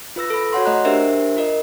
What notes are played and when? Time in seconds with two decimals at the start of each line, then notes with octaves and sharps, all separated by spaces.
0.16 F4 B4 E6 A#6
0.30 A4 B5
0.53 F#4 C#5 F#5 C6
0.65 A3 D#5 A#5 F#6
0.85 D4 G4 A#4 C5 E5
1.37 F4 A#4 D#5